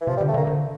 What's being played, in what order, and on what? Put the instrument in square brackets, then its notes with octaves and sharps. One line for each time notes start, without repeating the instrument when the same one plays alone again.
[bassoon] E3
[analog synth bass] C3 [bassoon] F3
[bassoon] G3
[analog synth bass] D3
[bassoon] A3
[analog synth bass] D3 [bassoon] A#3
[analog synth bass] D3